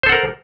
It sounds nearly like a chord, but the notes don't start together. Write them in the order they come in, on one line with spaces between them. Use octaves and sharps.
C5 A4 F#5 A#4